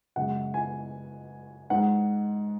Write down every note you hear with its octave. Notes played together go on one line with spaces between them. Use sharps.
F#2 C#3 G#3 F#5
G#5
G#2 G#3 F#5